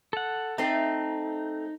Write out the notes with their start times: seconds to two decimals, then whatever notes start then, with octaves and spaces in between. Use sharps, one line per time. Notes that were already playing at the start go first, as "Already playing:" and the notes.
0.13 A4 F#5
0.58 A3 C4 D#4